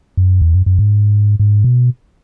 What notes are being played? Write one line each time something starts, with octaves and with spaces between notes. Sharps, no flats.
F#2
E2
F#2
F#2
G#2
G#2
B2